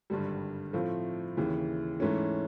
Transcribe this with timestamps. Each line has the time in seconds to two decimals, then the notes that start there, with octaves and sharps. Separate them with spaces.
0.10 G#1 G2 D3 G3
0.73 A2 F3 A3 C4 F4
1.37 D#2 C#3 E3
2.00 G#2 E3 A3 C#4